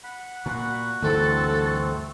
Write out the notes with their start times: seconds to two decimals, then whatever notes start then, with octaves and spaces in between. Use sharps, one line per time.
0.04 F#5 B5
0.46 A#2 F#4
1.02 D2 G2 E3 A3 C4 A4